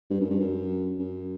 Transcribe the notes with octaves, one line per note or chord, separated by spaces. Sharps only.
G2
F#2
G2
F#2
F#2